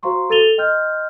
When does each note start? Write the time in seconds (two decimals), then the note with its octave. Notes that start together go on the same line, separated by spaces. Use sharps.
0.03 F#4 C5 F5 A#5 C6 C#6
0.30 A4 E6 A6 D#7 F7 G7
0.58 D#5 G5 C6 F6 G6